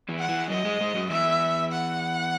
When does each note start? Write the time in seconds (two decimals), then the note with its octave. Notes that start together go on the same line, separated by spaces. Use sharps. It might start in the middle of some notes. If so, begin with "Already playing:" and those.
0.09 E2 E3
0.19 F#5
0.29 E2 E3
0.49 F#2 F#3 D#5
0.65 G#2 G#3
0.81 G#2 G#3
0.95 F#2 F#3
1.10 E2 E3 E5
1.72 F#5